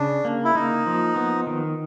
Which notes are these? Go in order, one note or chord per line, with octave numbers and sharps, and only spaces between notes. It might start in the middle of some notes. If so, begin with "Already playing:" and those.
Already playing: C#3 D4
A#3
E4
A#3 D#4
F3
B3
D#3